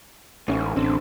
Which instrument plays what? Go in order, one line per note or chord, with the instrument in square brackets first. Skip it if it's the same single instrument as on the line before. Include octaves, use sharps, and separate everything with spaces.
[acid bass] A1 [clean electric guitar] G#2 C#4
[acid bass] A1 [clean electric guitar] D3 C4